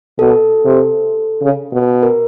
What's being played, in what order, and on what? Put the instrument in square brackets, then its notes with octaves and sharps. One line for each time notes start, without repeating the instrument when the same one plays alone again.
[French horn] B2 [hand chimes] A4
[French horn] C3
C#3
B2
[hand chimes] A#4